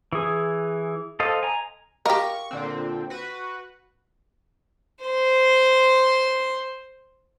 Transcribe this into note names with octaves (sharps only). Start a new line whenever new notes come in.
E3 G#4
A4 C5 D#5 F5
G#5 A#5
G4 A#4 D#5 F5 C#6 D6
A#2 D3 C4
F#4 B4
C5 C6